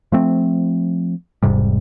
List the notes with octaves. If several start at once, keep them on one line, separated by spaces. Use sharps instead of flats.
F3 A3 C4
E1 G#2 C3 G3